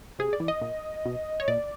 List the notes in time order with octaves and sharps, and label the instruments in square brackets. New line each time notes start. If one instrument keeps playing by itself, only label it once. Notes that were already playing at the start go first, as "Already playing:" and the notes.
[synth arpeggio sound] C3 G#4
D5
E3
D#5
A#2
B2
C#5
A#2 D5